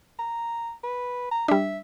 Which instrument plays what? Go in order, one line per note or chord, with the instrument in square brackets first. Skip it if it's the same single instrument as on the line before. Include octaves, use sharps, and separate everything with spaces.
[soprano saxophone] A#5
B4
A#5
[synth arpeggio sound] G3 D4 [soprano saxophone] E5